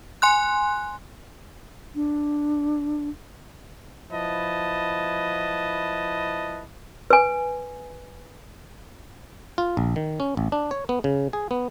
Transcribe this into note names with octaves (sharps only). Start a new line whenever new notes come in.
G#5 C6 F#6
D4
F3 E4 B4 D#5 A5
B4 G#5
F4
A#1
D#3
C#4
A1
D4
C#5
B3
C#3
G#4
B3